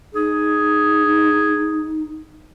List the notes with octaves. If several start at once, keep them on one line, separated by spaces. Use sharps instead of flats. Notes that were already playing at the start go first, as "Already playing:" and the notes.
D#4 G#4